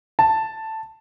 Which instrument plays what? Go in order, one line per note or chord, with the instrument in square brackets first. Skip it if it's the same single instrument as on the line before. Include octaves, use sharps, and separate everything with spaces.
[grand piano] A5